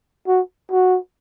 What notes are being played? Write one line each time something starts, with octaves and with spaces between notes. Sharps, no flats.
F#4
F#4